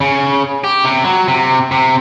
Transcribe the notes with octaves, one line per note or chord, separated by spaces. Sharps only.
C#3
G4
C3
F#3
C3
C3